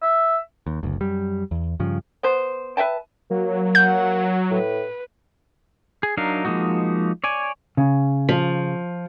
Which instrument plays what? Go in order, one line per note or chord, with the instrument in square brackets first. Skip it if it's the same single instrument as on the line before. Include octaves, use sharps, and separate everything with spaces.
[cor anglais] E5
[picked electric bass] D#2
F#1 D2
F#2 G3
E2
G2 C#3 F3
[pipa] B3 C5
B4 E5 G5 A5
[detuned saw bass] F#3 [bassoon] A#3
[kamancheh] F#5 [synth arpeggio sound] G6
[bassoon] A2 [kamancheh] B4
[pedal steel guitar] G#4
F#3 D4 D#4 A#4 F5
F3 G#3 A#3 D#4 F#4
C#5 D5 G#5
[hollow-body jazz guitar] C#3
[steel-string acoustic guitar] F3